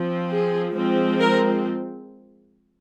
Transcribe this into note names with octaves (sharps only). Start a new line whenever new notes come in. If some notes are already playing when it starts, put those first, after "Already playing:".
Already playing: F3 C4
G#4
F3 G#3 C4
A#4